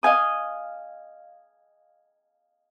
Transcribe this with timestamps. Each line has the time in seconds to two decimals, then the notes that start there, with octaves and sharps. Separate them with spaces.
0.03 D#5 F5 G#5 D#6